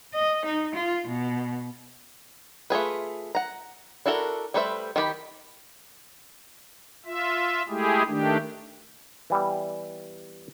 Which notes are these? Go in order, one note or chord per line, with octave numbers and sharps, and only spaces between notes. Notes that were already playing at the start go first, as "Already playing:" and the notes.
D#5
D#4
F4
B2
A3 F4 G#4 B4
F#5 A#5
D4 E4 F#4 A4 A#4
G3 A3 B4 C5 E5
D#3 F4 G4 B5
F4 E5
G#3 A3 E4 G4 G#4
D#3 A3 D4 G4
E3 G3 B3